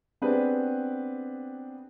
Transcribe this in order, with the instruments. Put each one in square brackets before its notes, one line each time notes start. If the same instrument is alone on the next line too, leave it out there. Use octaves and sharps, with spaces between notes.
[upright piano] B3 C4 D4 G4 G#4 B4